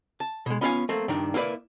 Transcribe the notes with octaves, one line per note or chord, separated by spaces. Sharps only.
A5
B2 G#3
B3 C#4 F4 A4 F5 G#5
A3 A#3 C4
G2 D#3 D4
A#3 E4 G#4 B4 D5